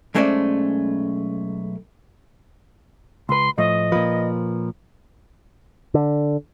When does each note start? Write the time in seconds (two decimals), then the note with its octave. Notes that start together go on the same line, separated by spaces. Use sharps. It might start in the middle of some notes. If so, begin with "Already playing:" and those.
0.14 B1 G#3 A3 C#4 C5 D5
3.29 C#2 B4 C6
3.58 A2 F3 A3 D#5
3.92 A#2 F3 B4
5.94 D3